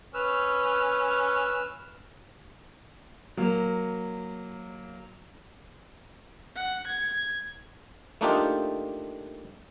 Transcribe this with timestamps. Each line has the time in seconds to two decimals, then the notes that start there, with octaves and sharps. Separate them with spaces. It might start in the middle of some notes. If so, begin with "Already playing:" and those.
0.14 C#4 B4 E6 F6
3.37 F#3 A#3
6.55 F#5
6.87 G#6
8.21 A3 A#3 D4 D#4 F4 G4